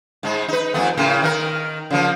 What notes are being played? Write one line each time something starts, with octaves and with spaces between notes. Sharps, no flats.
G#2 G#3
D#4 B4
F2 A3 B3
A2 C#3 A#3
D#3 D4 A#4
C#3 F3 A#3